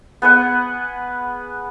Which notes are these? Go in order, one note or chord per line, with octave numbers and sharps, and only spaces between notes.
B3 G#4 B4 F#5